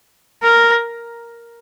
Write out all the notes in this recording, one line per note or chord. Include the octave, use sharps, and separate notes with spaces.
A#4